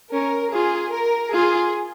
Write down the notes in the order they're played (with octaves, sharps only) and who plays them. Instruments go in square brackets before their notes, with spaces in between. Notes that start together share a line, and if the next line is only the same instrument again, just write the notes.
[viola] C#4 [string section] A#4
[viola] F4 [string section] G#4
[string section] A#4
[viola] F4 [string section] G#4